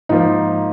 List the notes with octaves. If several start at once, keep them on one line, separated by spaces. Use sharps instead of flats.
G#2 F3 A#3 D#4